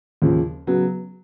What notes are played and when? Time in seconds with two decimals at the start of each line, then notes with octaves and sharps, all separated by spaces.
0.22 D#2 C#3 F3
0.67 C#3 F#3 B3